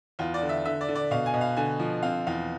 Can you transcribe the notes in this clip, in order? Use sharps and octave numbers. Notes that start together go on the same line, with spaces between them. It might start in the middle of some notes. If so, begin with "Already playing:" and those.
E2 F4
D5
D3
E5
D3 E5
D5
D3
D5
B2 F5
G#5
B2
F5
D3 G#5
F3
C4 F5
E2 F5